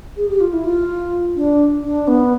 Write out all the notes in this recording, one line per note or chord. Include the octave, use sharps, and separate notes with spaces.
G#4
G4
F4
E4
F4
D4
D4
B3